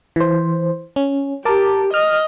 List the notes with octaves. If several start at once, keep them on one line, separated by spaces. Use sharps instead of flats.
E3 C5
C#4
G4 A#4 A5 D6
D#5 F6